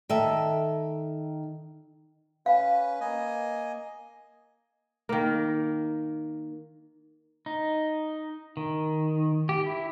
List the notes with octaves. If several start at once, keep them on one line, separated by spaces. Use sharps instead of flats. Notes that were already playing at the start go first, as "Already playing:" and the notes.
D#3 A4 E5
C#4 B4 F5
A#3 D#5 G#5
D#3 A#3
D#4
D#3
G4
E4